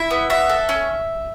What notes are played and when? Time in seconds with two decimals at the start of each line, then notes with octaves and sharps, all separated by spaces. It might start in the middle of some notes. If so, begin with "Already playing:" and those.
Already playing: E4 E5
0.11 B3
0.30 F#4 E5
0.49 A4
0.69 C#4